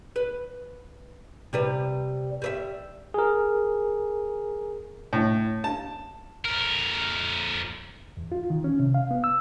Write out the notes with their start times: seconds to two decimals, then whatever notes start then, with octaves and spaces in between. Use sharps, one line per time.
0.16 B4
1.53 C3 G3 B4
2.42 G3 B4 E5
3.14 G#4 A#4
5.13 A2
5.64 A5
6.45 F2 A#4
8.17 E2
8.32 F4
8.50 D#3
8.64 C#4
8.80 C3
8.94 F5
9.11 B3
9.24 E6